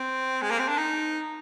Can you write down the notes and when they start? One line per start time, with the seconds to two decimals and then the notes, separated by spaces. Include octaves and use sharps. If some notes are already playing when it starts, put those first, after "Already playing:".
Already playing: C4
0.42 G#3
0.51 A#3
0.59 C4
0.68 D4
0.78 D#4